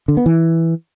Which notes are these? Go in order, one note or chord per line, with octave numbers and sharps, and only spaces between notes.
D3
B3
E3